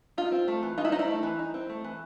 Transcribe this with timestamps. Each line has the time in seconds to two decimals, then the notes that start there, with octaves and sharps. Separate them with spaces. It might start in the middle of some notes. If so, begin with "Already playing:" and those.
0.18 D#4 F4
0.32 C4
0.48 A3
0.63 E3
0.78 D#4 F4
0.85 E4
0.92 C4 D#4
0.99 E4
1.08 A3
1.23 E3
1.39 D#4
1.54 C4
1.69 A3
1.84 E3